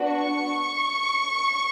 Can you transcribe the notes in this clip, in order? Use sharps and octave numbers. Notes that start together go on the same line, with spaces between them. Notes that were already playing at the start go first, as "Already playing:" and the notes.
Already playing: B3 D4 F#4
C#6